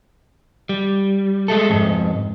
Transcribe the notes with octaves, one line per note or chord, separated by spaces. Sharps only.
G3
G#3 A3 A4
F2 G#2